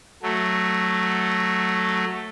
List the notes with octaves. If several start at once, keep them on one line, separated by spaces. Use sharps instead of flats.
F#3 A3